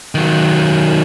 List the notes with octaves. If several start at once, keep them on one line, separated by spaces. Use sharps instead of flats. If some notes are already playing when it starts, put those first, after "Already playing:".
D#3 F#3